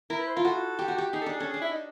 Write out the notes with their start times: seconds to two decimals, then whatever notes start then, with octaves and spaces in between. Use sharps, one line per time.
0.10 E4 A#4
0.19 B4
0.27 C5
0.36 F4 A#4
0.44 F#4 A4
0.79 G4
0.88 F#4
0.98 G4
1.13 D#4 G#4
1.21 A4
1.26 D4 G#4
1.38 C#4 A4
1.47 G#4
1.54 D4
1.61 E4
1.72 D#4